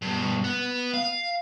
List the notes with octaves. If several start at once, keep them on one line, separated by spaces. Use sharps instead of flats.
G2 B2
B3
F5